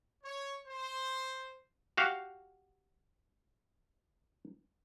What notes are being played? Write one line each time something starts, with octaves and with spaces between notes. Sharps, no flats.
C#5
C5
F#4 G4 F5